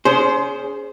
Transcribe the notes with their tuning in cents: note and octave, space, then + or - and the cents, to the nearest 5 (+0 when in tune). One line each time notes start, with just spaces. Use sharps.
C#4 +30 G#4 +0 C5 +0